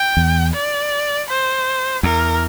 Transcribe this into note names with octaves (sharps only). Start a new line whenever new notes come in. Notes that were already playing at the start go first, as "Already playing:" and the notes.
Already playing: G5
E2
D5
C5
E2 A#4